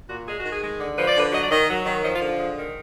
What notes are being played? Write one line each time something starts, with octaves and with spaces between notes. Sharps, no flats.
A#2 F#4
G#3 G#4
F#4
D#3
G#4
G#3
D3
F3 B4
D5
D3 B4
F#3 D#5
D5
D#3 D#5
F#3
D#3
F3 D#5
F4
D3
F4
G#3
D#3